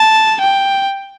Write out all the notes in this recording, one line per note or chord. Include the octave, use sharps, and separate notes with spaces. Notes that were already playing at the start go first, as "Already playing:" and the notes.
Already playing: A5
G5